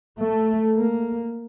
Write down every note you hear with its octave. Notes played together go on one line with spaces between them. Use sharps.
A3
A#3